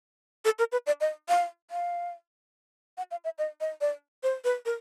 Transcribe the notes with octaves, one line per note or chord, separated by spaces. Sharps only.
A4
A#4
B4
D5
D#5
F5
F5
F#5
F5
E5
D#5
D#5
D5
C5
B4
A#4